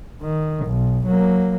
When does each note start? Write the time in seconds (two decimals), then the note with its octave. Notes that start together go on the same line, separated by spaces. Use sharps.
0.22 D#3
0.65 B1
1.06 F#3 A#3